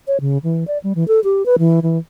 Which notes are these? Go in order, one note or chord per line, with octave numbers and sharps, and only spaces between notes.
C#5
C#3
E3
D5
G3
E3
A4
G4
B4
E3
E3